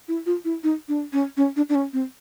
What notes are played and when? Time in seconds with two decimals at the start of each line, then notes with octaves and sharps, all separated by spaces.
0.08 E4
0.26 F4
0.45 E4
0.64 D#4
0.88 D4
1.13 C#4
1.37 C#4
1.56 D4
1.69 D4
1.75 C#4
1.93 C4